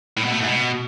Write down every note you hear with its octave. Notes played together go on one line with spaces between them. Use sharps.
A2
B2
A3
G#2
B2